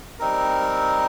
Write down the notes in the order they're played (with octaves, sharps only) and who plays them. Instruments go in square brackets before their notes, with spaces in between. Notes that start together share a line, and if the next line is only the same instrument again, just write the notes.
[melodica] G3 C4 D#4 A#4